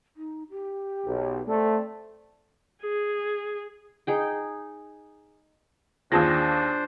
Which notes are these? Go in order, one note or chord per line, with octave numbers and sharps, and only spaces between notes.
D#4
G4
B1
A3 C4 A4 D5
G#4
D#4 G#4 G5
D#2 D4 F4 G#4 C5 G5 A5 A#6